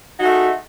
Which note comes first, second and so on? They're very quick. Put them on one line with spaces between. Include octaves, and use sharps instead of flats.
F#4 D#4 G#3 A3